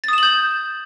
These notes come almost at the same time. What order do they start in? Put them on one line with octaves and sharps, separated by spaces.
A6 D#6 E7 F#7 G6